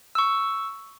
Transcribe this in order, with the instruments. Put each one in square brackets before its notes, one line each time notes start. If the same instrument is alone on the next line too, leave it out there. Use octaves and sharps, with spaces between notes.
[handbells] C#6 E6